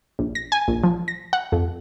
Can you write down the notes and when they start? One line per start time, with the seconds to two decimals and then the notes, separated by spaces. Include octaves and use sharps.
0.19 A#1
0.35 A#6
0.52 G#5
0.68 A#1
0.84 F3
1.08 A#6
1.33 F#5
1.52 F2